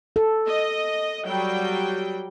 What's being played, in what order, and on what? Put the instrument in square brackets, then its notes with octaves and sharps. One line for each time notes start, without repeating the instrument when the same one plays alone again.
[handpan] A4
[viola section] D#5
F#3 G3 G5